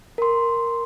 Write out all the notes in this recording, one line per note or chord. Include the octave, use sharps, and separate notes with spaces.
A#4 C6